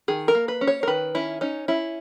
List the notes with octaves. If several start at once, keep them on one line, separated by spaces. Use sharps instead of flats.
D#3 G#4
A#4
A#3
B4
C#4
C#5
A#4
D#3 B4
C#4 E4
C#4 D#4
C#4 E4